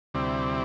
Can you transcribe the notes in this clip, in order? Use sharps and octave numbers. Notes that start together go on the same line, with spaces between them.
D2 C3 G3 C4 E4 D5